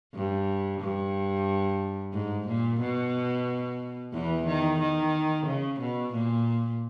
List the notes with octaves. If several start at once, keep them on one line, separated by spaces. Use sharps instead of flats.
G2
G2
G#2
A#2
B2
E2 E3
D#3
D#3
C#3
B2
A#2